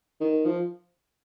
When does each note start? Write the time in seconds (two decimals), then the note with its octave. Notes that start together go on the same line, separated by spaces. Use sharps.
0.20 D#3
0.45 F3